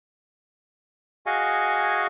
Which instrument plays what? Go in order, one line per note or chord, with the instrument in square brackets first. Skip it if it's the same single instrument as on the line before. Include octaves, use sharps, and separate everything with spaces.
[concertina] F#4 G#4 D#5 F5 G#5 C#6